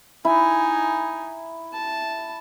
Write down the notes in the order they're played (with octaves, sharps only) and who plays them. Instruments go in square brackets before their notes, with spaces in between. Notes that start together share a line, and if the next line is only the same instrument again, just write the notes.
[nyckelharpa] D#4 G#5 [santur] E4
[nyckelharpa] A5